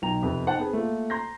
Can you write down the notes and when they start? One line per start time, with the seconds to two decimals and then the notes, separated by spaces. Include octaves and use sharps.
0.02 B1 B2 G5 A#5 F7
0.22 F2 C3 B3
0.47 D#4 C5 F#5 G5 A5
0.59 B3 C4 G#4
0.73 A3 A#3 F4
1.10 A#5 C6 G6 A#6